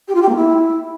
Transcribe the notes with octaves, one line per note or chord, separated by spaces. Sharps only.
G4
F4
G4
A#3
E4